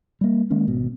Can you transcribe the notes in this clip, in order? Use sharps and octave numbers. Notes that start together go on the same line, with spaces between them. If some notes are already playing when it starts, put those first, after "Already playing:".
G3 A#3
D#3 G#3 A#3 C#4
G#1 B2